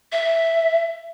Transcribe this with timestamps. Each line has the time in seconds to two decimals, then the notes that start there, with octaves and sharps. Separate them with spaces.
0.12 E5